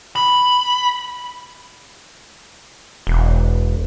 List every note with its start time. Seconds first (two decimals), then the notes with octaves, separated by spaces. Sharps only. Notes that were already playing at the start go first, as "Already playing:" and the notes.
0.16 B5
3.07 E1